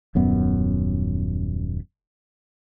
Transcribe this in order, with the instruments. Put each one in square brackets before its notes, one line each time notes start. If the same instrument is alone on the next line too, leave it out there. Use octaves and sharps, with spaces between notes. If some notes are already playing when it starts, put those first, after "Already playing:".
[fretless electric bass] D#1 F#2 B3